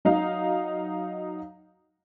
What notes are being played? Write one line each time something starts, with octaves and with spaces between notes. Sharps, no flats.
F#3 D#4 F5